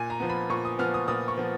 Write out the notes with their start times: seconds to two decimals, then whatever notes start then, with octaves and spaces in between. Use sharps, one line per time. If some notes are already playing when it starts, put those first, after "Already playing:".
Already playing: A#2 G#5
0.10 A#5
0.20 F3 B3
0.30 B5
0.50 A#2 C#6
0.65 D#6
0.79 F3 B3 F6
0.94 D#6
1.08 A#2 D#6
1.28 C#6
1.38 F3 B3